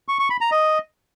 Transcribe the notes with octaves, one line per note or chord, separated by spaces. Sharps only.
C#6
C#6
B5
A#5
D#5